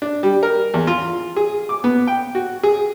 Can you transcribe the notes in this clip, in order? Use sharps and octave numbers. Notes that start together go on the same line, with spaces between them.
D4
G3
A#4
E2
F4
G#4
D6
B3
G5
F#4
G#4